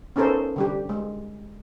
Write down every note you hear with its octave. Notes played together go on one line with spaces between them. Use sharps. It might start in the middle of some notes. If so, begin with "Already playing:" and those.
B3 C#4 D#4 A4 A#4 C5
D3 G3 G4
G#3